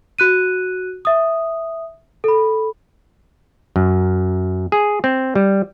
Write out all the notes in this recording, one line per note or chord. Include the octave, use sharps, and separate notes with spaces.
F#4 F#6 D#7
E5 D#6
A4 B5
F#2
G#4
C4
G3